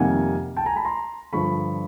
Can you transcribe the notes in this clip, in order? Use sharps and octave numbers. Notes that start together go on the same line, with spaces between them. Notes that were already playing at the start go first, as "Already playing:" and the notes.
Already playing: F2 C3 D#3 G3 A#3 F#5 G#5
G5 A5
G#5 A#5
A5 B5
A#5 C6
G2 D3 F3 B5 C#6